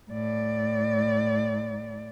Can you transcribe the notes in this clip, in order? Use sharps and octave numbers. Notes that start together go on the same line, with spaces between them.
A2 D5